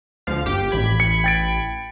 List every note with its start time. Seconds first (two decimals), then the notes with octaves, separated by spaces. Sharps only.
0.27 D2 F3 F5
0.45 G1 G4 D6
0.71 A1 B5 G#6
1.00 C#7
1.24 G5 A6 D7